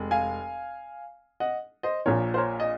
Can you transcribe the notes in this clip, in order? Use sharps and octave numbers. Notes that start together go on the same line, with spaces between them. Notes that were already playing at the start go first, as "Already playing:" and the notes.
Already playing: F1 G#3
F5 G#5
D#5 F#5
C5 D#5
A#1 A#2 F3 A#4 C#5
C5
A#4 C#5
D#5